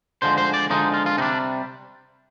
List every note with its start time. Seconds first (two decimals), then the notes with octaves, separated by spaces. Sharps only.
0.22 D3 F3 G#3 C5
0.38 C5
0.54 D5
0.70 D3 F3 G#3 D#4
0.94 F4
1.06 F4
1.18 C3 G3 D4 D#4